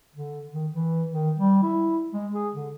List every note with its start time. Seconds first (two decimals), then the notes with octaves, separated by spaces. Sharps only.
0.15 D3
0.53 D#3
0.75 E3
1.11 D#3
1.36 G3
1.63 E4
2.13 G#3
2.34 G#4
2.54 D3